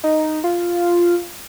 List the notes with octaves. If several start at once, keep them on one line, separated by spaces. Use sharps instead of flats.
D#4
F4